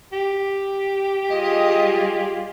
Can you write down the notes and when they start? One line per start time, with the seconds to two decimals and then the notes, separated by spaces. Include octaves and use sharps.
0.12 G4
1.30 G3 F4 G#4 D#5